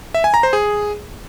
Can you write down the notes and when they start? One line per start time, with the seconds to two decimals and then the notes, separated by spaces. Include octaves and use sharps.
0.14 E5
0.24 G#5
0.34 A#5
0.43 C5
0.53 G#4